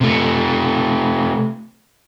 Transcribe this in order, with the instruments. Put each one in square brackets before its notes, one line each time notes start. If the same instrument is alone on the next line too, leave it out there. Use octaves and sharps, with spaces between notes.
[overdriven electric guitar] C3 A3